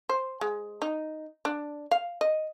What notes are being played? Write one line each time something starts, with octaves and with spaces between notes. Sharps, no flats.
C5
G#3
D#4
D4
F5
D#5